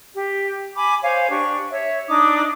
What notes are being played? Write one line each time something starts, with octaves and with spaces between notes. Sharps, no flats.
G4
G#5 B5 D6
C5 C#5 F5 G#5
D4 G4 C#6
C#5 E5
D4 D#4 D6 D#6